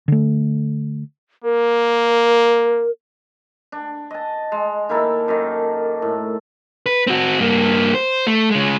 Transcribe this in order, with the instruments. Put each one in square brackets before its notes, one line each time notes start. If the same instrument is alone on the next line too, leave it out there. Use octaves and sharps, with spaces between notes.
[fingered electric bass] D3 A3
[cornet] A#3 [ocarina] A#4
[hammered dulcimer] D4
D#5 A5
G#3
D#3 A#3 E4 A4
F#2 D#3
A2
[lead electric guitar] B4
C4 F#4
G2 A#3
C5
A3
C#3 G#3